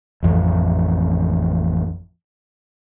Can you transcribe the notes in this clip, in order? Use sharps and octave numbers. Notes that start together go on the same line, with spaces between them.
A1 F2 F3